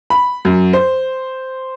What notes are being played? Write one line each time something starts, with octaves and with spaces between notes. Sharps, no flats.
B5
F#2
C5